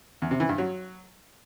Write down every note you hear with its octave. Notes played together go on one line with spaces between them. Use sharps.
E2
C3
E3
G2
F#3